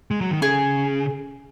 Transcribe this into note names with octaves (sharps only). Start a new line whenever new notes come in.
G#3
F#3
D#3
C#3 G#4